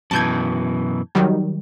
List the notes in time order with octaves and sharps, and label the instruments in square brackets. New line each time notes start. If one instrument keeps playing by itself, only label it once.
[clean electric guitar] F#2 B2 E3 [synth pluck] A5 G6 G#6
[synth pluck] D#3 F#3 G3